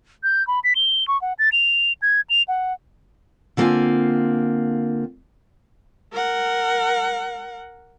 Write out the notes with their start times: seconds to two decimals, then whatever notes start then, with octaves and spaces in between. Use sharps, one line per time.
0.23 G6
0.47 B5
0.64 B6
0.75 G7
1.08 C#6
1.21 F#5
1.39 A6
1.52 F7
2.02 G#6
2.29 F7
2.48 F#5
3.57 D3 F#3 A#3 C4 F4 G#5
6.12 A#4 F#5